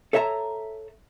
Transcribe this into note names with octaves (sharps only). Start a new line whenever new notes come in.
A4 C#5 E5 A5 A#5